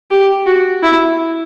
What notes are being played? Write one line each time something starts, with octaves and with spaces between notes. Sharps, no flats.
G4
F#4
E4